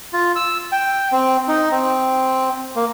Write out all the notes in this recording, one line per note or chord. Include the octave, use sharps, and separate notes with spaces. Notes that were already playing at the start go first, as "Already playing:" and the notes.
F4
E6
G5
C4
D#4
C4
A#3